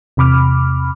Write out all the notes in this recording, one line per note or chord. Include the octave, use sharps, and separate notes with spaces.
E2 C3 B5 D6 F6